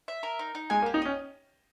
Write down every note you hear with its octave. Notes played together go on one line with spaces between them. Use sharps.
E5
A#4
D#4
D#4
G#3 G#5
A#3
G4
D#4
C#4 D#5